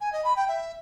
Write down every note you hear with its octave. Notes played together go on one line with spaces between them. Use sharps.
G#5
D#5
B5
G5
E5